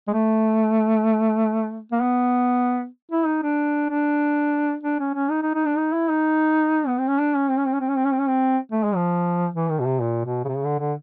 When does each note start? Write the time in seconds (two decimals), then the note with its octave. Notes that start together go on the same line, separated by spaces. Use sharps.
0.08 G#3
0.13 A3
1.92 A#3
2.01 B3
3.12 E4
3.26 D#4
3.43 D4
3.89 D4
4.84 D4
5.00 C#4
5.15 C#4
5.30 D#4
5.42 D#4
5.55 D#4
5.66 D4
5.77 D#4
5.93 E4
6.09 D#4
6.87 B3
6.98 C4
7.08 C#4
7.19 D4
7.35 C#4
7.50 C4
7.58 C#4
7.66 C4
7.73 C#4
7.81 C4
7.89 C#4
7.96 C4
8.05 C#4
8.12 C4
8.19 C#4
8.28 C4
8.72 A3
8.84 G#3
8.96 F3
9.54 E3
9.70 D#3
9.80 B2
9.86 C3
10.02 A#2
10.26 B2
10.44 C#3
10.48 C3
10.56 C#3
10.65 D3
10.79 D3